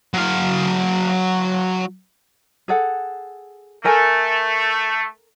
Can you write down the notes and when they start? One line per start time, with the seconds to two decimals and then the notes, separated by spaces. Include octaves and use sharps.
0.14 F#3 F5
2.68 G#4 A4 F#5
3.84 A3 A4 A#4 G#5